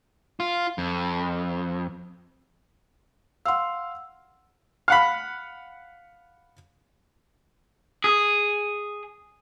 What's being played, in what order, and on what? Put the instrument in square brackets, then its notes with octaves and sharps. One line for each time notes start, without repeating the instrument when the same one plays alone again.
[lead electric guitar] F4
F2
[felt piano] F5 C6 [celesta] F#5 E6
[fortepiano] F5 F#5 B5
[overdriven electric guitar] G#4